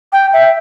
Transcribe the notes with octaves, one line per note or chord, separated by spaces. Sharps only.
G5
E5